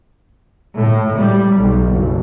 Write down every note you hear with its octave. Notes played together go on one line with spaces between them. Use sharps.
A2
G3
B1
F#1